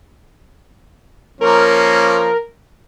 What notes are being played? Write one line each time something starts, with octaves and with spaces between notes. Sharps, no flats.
F3 A#3 C#4 A#4